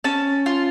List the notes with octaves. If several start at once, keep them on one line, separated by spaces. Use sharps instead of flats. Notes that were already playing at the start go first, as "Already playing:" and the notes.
C#4 A5
F4